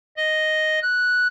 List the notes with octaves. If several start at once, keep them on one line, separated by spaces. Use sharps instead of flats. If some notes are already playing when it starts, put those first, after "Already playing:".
D#5
F#6